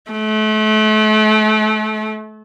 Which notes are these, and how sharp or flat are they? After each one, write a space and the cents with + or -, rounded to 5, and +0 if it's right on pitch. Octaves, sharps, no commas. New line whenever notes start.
A3 -35